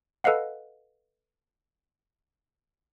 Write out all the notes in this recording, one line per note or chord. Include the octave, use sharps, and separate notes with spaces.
A4 B4 D#5 F5 F#5